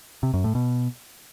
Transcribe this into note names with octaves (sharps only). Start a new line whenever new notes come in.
C3
F#2
A2
B2